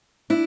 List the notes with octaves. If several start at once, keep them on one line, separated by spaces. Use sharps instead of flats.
D4 E4